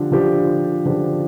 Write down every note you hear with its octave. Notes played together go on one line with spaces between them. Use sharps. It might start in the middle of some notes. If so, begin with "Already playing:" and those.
Already playing: D3 F3 D4 G4
D3 F3 D4 G4
D3 F3 D4 G4